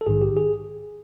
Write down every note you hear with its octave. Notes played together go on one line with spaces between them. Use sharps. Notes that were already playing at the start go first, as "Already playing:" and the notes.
A4
A#1 G#2 D#3 G#4
G4
G#4